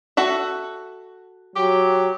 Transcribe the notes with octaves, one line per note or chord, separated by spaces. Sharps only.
F#4 A4 E5
F#3 G4